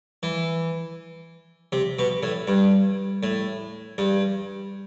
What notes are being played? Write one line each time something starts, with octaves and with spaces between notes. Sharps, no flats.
E3
C3
B2
A2
G2
A2
G2